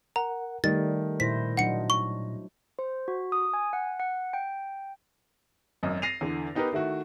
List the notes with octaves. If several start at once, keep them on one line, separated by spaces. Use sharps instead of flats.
A#4 F#5 A#5
D#3 G3 A3 D5 A6
A#2 E4 C5 A#6 B6
F#3 D4 D#4 F#5 C#7
C#6
C5
F#4
D#6
G#5
F#5
F#5
G5
G#1 F#2 D#5
A6 A#6 C7 D#7 F7
E2 D3
B3 D#4 G4 A#4 B4
D#3 A3 E4 F#4